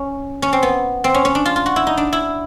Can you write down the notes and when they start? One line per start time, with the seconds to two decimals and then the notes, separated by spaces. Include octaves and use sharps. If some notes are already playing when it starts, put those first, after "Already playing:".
Already playing: C#4
0.42 C#4
0.53 C4
0.63 B3
1.04 C4
1.14 C#4
1.25 C#4
1.35 D4
1.45 F4
1.56 F4
1.66 F#4
1.76 E4
1.87 D#4
1.97 D4
2.13 E4